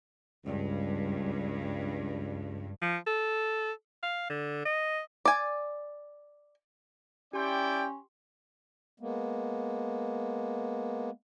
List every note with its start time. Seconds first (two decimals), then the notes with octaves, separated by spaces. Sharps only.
0.46 C#2 G2
2.82 F3
3.07 A4
4.03 F5
4.29 D3
4.65 D#5
5.25 D5 G#5
7.33 C#4 E4 G4 D5 G5 C6
9.00 G#3 A#3 B3